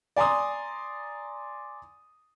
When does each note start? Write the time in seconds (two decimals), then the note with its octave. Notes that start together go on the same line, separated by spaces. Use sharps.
0.16 D5 G#5 A#5 C6 D#6